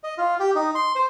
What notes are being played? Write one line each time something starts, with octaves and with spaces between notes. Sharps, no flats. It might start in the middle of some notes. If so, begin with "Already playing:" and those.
D#5
F4
G4
D#4
C6
C5